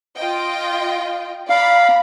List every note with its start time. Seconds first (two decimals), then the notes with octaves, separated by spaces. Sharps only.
0.18 F4 D#5 G5
1.50 D5 F5 A#5 B5